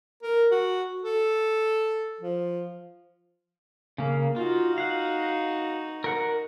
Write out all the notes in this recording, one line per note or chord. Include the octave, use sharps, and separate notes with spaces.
A#4
F#4
A4
F3
C#3 A#3
D#4 F4 F#4
F5 F#5
A#4 F#5